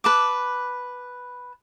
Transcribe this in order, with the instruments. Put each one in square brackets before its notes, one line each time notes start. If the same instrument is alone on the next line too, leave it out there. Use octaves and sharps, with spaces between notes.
[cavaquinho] B4 A5 D6